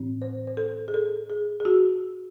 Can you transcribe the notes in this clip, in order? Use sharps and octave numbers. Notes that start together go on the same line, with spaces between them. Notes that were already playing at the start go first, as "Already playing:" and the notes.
Already playing: A2 E3 C4
C5
C5
A4
G#4
A4
G#4
G#4
F#4